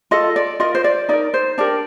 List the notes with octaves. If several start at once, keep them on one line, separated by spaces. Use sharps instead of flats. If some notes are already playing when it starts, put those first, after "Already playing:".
F4 A4 D#5
D5
F4 A#4 D#5
C5
D5
D#4 A#4 D5
C5
D4 G4 A#4 D5